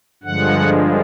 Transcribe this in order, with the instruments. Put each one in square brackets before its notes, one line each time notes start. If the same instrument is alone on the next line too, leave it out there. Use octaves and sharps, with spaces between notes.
[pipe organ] G2 D3 F3 G#3 F#5